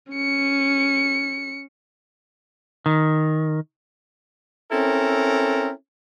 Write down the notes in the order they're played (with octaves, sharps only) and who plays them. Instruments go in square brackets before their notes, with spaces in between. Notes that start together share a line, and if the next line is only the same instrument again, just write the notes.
[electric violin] C#4 C#7
[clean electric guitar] D#3
[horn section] C4 C#4 E4 A4 A#4